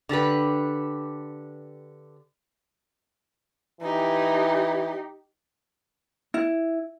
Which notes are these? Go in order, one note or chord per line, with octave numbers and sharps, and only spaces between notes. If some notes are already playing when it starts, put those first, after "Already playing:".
D3 D4 G4 B4
E3 D#4 G4
E4